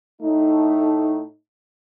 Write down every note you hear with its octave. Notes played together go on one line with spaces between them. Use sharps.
A2 A3 D#4